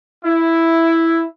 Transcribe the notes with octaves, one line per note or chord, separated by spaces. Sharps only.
E4